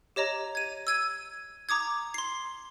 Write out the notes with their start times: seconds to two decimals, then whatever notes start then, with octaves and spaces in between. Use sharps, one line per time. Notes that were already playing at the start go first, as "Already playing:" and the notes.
0.16 G4 C#5 D#5 A#5
0.55 G#6 D#7
0.87 E6 G#6 D#7
1.69 A#5 D6 D#6 G#6
2.14 C6 C7